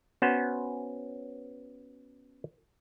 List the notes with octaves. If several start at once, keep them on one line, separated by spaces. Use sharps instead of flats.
B3 C#4 F#4 C5